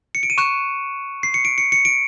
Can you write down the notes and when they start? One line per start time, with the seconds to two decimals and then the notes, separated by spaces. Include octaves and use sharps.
0.15 C#7
0.23 D7
0.30 D#7
0.38 C#6 F#6 E7
1.23 C7
1.34 C#7
1.45 D7
1.58 C#7
1.72 C#7
1.85 D7